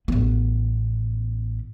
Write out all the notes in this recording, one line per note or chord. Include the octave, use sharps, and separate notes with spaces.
A1 B3